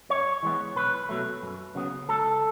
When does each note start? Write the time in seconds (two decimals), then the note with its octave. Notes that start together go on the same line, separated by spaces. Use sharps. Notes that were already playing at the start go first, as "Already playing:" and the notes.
0.09 F#2 C#5
0.43 E3 G#3 B3
0.76 B1 B4
1.09 B2 F#3 A3
1.42 F#2
1.75 C#3 F#3 B3
2.09 C#2 A4